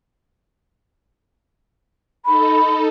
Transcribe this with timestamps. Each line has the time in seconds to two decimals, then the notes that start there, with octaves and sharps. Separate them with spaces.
2.25 D#4 A4 B5